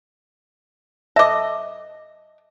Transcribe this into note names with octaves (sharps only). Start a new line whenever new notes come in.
A4 D#5 E5 D6